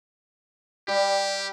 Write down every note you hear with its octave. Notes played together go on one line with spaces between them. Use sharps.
G3 G4